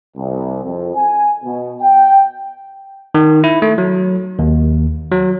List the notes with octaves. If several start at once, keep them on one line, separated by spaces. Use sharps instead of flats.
C2
F2
G#5
B2
G5
D#3
E4
A3
F#3
D#2
F#3